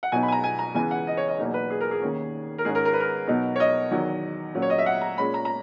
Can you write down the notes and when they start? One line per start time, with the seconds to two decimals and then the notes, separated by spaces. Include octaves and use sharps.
0.03 F#5
0.12 B2 F#3 B3 D#4 G#5
0.23 B5
0.28 G#5
0.32 A#5
0.44 G#5
0.59 A#5
0.74 C#2 C#3 E3 G#3 B3 G#5
0.91 F#5
1.07 D#5
1.17 C#5
1.28 D#5
1.39 E2 B2 F#3 A#3 D#4
1.54 B4
1.70 G#4
1.81 A#4
1.91 G#4
2.02 D#2 D#3 A#3 C#4
2.58 A#4
2.65 G#2 D#3 G#3 C#4 G#4
2.75 A#4
2.85 A#4
2.93 B4
3.00 A#4
3.27 B2 F#3 B3 D#4
3.56 C#5
3.60 D#5
3.91 E2 D#3 F#3
4.54 A#2 F#3 C#4
4.62 C#5
4.70 D#5
4.78 E5
4.86 F#5
5.01 A#5
5.18 A#2 G#3 C#4 B5
5.34 A#5
5.45 A#5